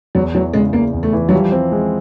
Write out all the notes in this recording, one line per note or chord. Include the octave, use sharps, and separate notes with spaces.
E2 F#3
E3 F#3
C#3 G#3
E2 A#3
E2
A3
E3
F#3
F3 G3
C4
G#3